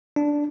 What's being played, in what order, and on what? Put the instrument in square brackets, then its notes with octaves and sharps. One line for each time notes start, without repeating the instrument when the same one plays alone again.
[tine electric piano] D4